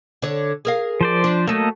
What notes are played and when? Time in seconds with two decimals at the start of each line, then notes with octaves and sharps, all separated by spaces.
0.22 D3 C#5
0.65 G#4 A#4 F5
1.01 F3 C5 D5
1.24 D4
1.48 F#3 A3 A#3 A4 D#5